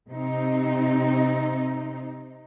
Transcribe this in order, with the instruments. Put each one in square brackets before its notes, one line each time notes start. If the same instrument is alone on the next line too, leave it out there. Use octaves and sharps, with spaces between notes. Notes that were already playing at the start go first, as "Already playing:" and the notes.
[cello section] C3 C4 D#4